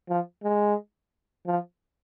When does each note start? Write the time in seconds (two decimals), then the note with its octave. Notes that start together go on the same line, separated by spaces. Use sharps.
0.09 F3
0.43 G#3
1.47 F3